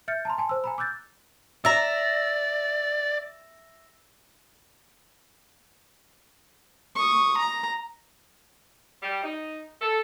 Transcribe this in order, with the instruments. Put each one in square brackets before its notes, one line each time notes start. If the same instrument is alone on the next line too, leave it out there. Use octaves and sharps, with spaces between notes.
[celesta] E5 F6 G6 A6 C#7
A5 A#5 C6
G#5 A5 C6
C5 E6
G#5 A#5 B5
D6 E6 F#6 G6 A6
[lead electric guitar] D5 [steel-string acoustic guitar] E5 A#5 [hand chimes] E6 A#6
[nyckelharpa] C#6 D#6
A#5
[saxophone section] G3
D#4
A4